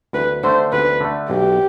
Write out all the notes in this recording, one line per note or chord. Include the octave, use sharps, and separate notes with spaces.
D2 B4
D3 A3 C5
D2 B4
D3 A3
B1 G4